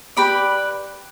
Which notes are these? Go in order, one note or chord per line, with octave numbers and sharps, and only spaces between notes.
G4 B4 D5 B5